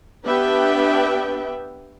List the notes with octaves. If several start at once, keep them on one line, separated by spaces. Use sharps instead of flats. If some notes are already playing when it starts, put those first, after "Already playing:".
B3 D4 G4 B4 E5 G5